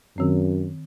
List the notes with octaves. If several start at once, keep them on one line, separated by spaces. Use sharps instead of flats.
F#2 D#3 C4